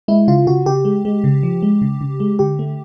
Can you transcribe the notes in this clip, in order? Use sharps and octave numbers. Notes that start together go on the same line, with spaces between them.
G#3 E4
C#3 F4
C#3 F#4
C#3 G4
G#3
G#3
C#3
F3
G#3
C#3
C#3
G#3
D3 G4
A3